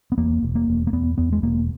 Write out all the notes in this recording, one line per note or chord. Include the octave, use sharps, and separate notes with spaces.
B3
E2 A#3
E1
A#3
E1
A#3
E2 B3
E2 B3
G#3
E1 A#3